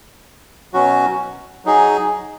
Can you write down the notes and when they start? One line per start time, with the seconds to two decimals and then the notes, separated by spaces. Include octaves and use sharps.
0.74 B2 F#3 C#4 F#4
1.65 F#3 D#4 G#4